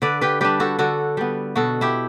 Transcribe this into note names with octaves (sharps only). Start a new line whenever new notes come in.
D3 B4 D5
G4 B4
G3 D4 G4 B4
F#4 A4
D3 F#4 A4
G3 B3
B2 F#4 A4
E4 G4